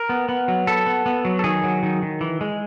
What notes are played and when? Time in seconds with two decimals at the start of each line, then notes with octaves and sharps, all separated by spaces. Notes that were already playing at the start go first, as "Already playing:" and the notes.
Already playing: A#4
0.09 B3
0.29 B3
0.48 F#3
0.67 B3 A4
0.87 B3
1.06 B3
1.25 F#3
1.39 A4
1.44 D#3 G#4
1.64 F#3
1.83 D#3
2.02 D#3
2.21 E3
2.41 G#3